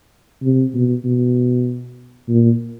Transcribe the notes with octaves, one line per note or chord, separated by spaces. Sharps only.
C3
B2
B2
A#2